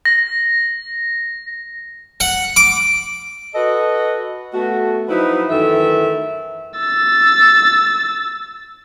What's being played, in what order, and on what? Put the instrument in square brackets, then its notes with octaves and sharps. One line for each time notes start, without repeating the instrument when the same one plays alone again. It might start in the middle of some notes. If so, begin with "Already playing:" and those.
[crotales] A#6
[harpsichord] F#5
D6
[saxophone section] F#4 A4 B4 D#5
A3 B3 F#4
F3 F#3 D#4 E4 B4 C5
F#2 D#3 E3 A3 E5
[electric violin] E6 A6